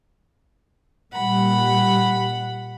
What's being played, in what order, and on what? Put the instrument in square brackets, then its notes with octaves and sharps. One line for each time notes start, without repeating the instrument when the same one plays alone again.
[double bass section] A#2 G3 [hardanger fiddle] F#5 B5